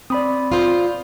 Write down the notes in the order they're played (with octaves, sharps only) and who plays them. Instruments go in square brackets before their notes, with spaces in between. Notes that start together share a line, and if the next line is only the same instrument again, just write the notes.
[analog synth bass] C4 [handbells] D5 B5 D#6
[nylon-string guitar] F4 C5